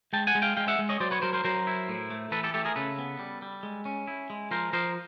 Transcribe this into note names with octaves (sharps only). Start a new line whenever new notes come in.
G#3 G5 A5
F#5 G#5
G#3
F5 G5
G#3 F5 G5
E5 F#5
G#3
C#5 D#5
F#3 C5 D5
B4 C#5
F#3 A#4 C5
A#4 C5
F#3 A#4 C5
E4
A2
A3
E3 A4 B4
G4 A4
A3 G4 A4
G#4 A#4
C#3 A4 B4
B3
G3
G3
G#3
C#4
E4
G#3
F3 A#4 C5
F3 A#4 C5